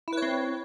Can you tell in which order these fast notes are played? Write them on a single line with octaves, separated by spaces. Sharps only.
E4 B4 C#5 C4